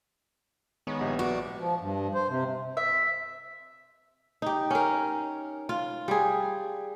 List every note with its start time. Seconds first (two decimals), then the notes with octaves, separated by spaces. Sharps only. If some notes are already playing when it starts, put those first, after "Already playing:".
0.87 D#3 G#3 B3 C#5
1.01 A#1 G4 D#5
1.19 F#4 D5 C#6
1.59 F3
1.81 G2
2.14 C5
2.29 C3
2.77 E5
4.42 D#4 G4
4.71 C#4 A#4
5.69 F4
6.08 G3 G#4